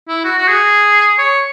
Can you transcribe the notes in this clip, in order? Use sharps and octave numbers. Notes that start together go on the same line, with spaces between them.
E4
F#4
F#4
G#4
C#5